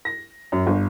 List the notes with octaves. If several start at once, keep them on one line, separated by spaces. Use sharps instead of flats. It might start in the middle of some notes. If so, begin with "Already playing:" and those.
A#6
F#2
G1